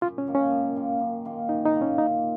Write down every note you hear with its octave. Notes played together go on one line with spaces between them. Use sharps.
F#2 F4
C#4
D#3 A#3 F4
C#4
F#2
D#3 A#3 F4
F#2
D#3 A#3 F4
F#2 D#4
D#4
D#3 A#3 F4
C#4
A#2 D#4